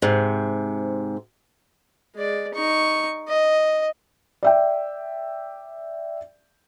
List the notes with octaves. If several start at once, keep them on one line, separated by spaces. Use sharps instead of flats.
G#2 C3
G#3 D5
D#4 C#6
D#5
D5 E5 G5